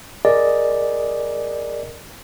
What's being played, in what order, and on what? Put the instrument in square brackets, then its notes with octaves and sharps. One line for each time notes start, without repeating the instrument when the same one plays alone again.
[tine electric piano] G#4 A#4 D5 D#5